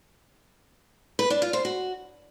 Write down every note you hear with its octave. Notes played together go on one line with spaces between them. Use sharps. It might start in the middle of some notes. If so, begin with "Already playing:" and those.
B4
D4
F4
C5
F#4